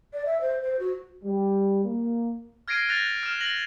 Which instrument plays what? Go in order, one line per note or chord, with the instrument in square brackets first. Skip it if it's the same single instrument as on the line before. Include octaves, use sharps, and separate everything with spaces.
[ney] D5
E5
C5
C5
F#4
[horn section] G3
A#3
[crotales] F6 G#6 A#6 C7 D7 D#7
F#6 A6 A#6 F7
F6 E7
A#6 F#7